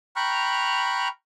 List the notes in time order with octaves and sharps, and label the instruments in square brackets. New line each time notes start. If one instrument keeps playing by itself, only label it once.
[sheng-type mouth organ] G5 A#5 B5 C#6 F6 F#6